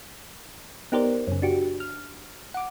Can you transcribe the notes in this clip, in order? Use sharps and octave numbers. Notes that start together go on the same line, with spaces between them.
B3 D#4 G4 A#4 C5 D5
F#2 C#3
D4 F#4 G4
F6
F#5 D6